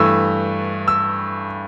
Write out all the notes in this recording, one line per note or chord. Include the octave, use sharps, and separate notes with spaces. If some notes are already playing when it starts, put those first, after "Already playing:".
Already playing: G2 E3 A3 E6
E6